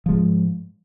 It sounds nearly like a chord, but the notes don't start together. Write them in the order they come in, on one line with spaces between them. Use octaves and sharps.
F3 G#3 G#2